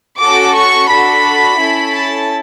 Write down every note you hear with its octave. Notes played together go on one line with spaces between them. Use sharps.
C#4 F#4 A4 D6
C#6
D4 F#4 A4 B5
C#4 E4 A4
A5